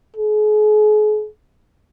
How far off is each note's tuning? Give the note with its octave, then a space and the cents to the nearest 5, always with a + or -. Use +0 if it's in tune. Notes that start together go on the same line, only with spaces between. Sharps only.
G#4 +40